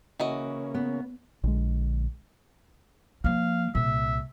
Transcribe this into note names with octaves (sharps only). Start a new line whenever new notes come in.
C#3 E3 A#3 C#4 F#4 D#5
B3
A#1 D3 G#3
F3 A#3 F5
C2 A#2 E5